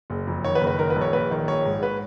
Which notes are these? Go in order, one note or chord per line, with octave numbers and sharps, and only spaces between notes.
F#1
F2
D#3 C#5
B4
F#1
B4
D#3 A#4
B4
A#1
C#5
A#1 B4
D#3
A#1 C#5
G#2
B4